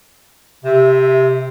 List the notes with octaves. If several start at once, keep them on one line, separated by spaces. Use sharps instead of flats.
C3 E5